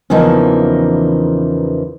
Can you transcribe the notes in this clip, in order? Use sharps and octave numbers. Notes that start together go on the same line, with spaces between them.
E2 C#3 E3 F3 A#3 D#4